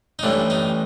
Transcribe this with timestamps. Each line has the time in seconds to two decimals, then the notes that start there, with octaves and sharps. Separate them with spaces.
0.19 D#4
0.23 A1 A2 E3 G3 D4
0.50 D#4